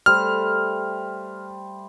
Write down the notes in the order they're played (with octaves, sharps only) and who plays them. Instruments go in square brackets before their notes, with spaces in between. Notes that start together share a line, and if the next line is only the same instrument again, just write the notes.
[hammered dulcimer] G3 A3 C5 [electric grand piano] F6